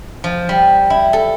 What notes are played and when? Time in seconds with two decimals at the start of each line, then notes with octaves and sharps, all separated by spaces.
0.24 F3
0.49 G3
0.90 E4
1.13 A4